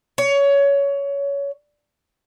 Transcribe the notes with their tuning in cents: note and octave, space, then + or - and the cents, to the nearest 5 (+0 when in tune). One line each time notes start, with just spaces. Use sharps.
C#5 +20